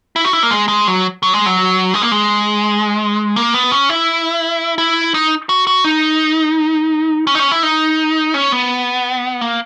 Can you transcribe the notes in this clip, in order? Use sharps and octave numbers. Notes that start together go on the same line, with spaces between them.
E4
F#4
E4
A#3
G#3
G#3
F#3
F#3
G#3
F#3
G#3
A#3
G#3
A#3
B3
C#4
E4
E4
D#4
F#4
F#4
D#4
C#4
D#4
C#4
E4
D#4
C#4
B3
A#3